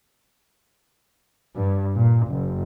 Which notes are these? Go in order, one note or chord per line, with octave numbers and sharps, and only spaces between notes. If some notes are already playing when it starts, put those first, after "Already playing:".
G2
A#2
F#1